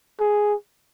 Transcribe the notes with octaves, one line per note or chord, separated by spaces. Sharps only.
G#4